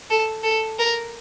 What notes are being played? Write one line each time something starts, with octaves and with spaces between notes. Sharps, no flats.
A4
A4
A#4